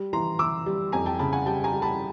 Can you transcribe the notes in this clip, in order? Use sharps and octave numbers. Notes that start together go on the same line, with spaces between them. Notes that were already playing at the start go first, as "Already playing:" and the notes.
Already playing: G3
E3 A#5 C6
E3 D6 E6
G3
F2 G#5 A#5
G5 A5
C#3 A5 B5
F#5 G#5
G3 G5 A5
G#5 A#5
G3
A5 B5